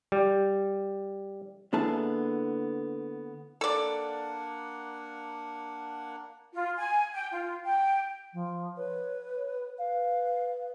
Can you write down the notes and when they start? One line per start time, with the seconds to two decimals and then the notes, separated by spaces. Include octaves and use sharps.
0.12 G3
1.73 D3 A#3 B3 E4 G#4 A5
3.61 A#3 D4 A4 D5 F#5
6.53 F4
6.77 G#5
7.14 G5
7.31 F4
7.64 G5
8.33 F3
8.76 B4 C#5
9.78 B4 F5